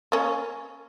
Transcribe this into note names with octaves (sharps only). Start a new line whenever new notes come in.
A#3 C#4